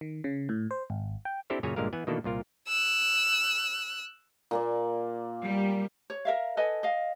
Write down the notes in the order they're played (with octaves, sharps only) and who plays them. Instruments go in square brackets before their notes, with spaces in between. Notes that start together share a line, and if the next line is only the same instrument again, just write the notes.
[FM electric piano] D#3
C#3
A2
C5
G#1
G5
[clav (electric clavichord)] C4 D4 E4 G4 A4 C5
F#2 A#2 C#3 C#5 G#5 A#5
G1 A#2 D3 G#3 A#4 F5
E3 B3 F#5 G#5
B2 D#3 E3 A#3 D4 A4
C2 A#2 F4 A#4
[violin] E6 F#6
[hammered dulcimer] A#2 A#3 D5
[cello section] G3
[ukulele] C#5
A#4 E5 F5
A4 B4 D#5 G#5
D#5 F5